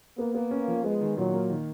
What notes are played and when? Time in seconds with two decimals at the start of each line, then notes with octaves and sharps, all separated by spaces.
0.18 A#3 B3
0.35 B3
0.51 C#4
0.68 F3
0.84 G#3 B3
1.01 D#3
1.17 A#2 F#3
1.33 A#3
1.50 D#3